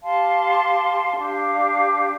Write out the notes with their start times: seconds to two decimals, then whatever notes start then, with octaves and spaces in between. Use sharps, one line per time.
0.03 G4 F5 A5 C6
1.18 D4 G4 F5